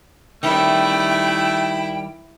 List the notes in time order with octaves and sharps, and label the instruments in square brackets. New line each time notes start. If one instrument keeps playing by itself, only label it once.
[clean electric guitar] D#3 G3 [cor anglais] A3 [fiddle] E4 [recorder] G5